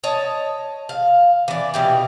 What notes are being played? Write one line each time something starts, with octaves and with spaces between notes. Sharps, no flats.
C#5 D#5 A5
F5
E3 D5
B2 E3 G4